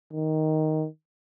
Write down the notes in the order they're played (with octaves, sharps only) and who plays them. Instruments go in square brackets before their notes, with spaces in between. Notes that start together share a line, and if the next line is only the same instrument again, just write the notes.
[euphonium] D#3